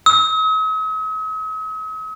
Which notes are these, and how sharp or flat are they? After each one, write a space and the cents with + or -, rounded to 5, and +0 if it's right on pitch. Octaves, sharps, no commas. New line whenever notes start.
D#6 +45